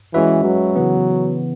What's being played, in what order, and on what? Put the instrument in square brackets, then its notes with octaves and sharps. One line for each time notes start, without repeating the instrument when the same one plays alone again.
[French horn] E3 [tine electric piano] G#3 C#4 F#4 B4 E5
[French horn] F#3
[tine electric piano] C#3 E3 B3